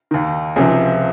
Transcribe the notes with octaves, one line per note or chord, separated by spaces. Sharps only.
D#2 D#3
C#2 C3 F3 G#4